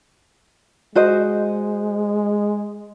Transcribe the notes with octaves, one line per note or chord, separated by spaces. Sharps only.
G#3 F#4 C5 D#5